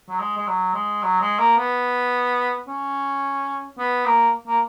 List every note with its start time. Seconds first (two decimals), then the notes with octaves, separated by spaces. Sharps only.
0.09 F#3
0.20 G#3
0.37 G#3
0.47 F#3
0.74 G#3
1.03 F#3
1.21 G#3
1.39 A#3
1.58 B3
2.68 C#4
3.78 B3
4.05 A#3
4.47 A#3